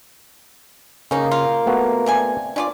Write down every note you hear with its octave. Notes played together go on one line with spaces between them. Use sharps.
C#3 A#3 C#4 D#4
F4
A3 B3 F#4
C3 D4 G#5
C#4 D4 F4 D5